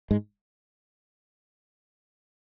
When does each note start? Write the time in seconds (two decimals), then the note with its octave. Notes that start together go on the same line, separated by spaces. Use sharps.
0.11 G#2 G#3